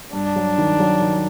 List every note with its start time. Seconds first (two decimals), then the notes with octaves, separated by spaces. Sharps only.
0.13 G2 D4
0.36 F#3
0.58 D#3
0.80 F#3
1.01 D#3